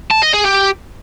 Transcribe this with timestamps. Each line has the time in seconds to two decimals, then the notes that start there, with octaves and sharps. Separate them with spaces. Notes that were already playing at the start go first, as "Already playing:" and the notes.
0.10 A5
0.22 D#5
0.33 G#4
0.45 G4